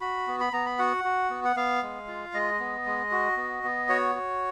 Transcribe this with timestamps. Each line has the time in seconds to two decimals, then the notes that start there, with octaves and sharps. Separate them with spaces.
0.01 F#4 B5
0.27 B3
0.40 B5
0.53 B3 A#5
0.66 B5
0.79 F#4 F#5
1.04 F#4
1.30 B3
1.44 F#5
1.56 B3 F5
1.83 G#3
2.08 F4
2.34 G#3 D#5
2.60 B3
2.86 G#3
3.12 F#4
3.37 B3
3.64 B3
3.89 F#4 C#5
4.15 F#4